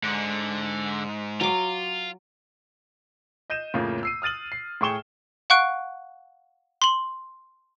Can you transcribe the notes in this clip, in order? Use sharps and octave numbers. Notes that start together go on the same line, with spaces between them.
G#2 D3
F#3 F4 D6
D#5 G6 D#7 E7
F2 A2 C#3 A#3 F4
E6 C7 D#7
D#6 F6 A6 D#7 F#7
C7
A2 G#4 G5 C#6 E7 G7
F5 F#5 C#6 F#6 D7
C6 F#7